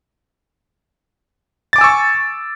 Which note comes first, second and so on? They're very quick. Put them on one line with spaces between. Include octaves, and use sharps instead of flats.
A6 D6 G#5 E6 C#6